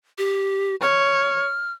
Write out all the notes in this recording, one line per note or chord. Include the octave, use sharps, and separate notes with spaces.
G4
C#5 F6